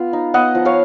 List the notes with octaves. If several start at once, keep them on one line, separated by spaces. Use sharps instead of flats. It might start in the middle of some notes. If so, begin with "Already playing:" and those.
Already playing: B3 F4 F5 B5
D#4
B3 D#5 F#5
F3
C#5 F5